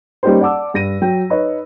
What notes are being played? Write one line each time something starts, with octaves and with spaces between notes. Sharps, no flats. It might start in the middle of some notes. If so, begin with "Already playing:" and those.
G3 A#3 C#4 D#4 G4 C5
D5 F#5 A5 D6 E6
G2 A#6 D#7
F#3 G5
D#4 B4 C#5 D#5